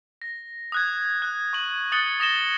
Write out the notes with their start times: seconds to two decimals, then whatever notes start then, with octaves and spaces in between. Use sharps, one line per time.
0.22 A#6
0.72 D#6 F#6 G#6
1.22 F#6
1.53 C#6 F#7
1.92 D#6 F#6 A6 C#7 F#7 G7
2.20 D#6 A#6 E7 G7